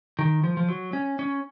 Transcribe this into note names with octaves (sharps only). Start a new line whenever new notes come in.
D#3
F3
F3
F#3
C#4
C#4